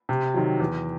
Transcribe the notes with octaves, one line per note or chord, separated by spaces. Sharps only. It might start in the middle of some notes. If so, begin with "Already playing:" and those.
C3
D#3 F#3
E2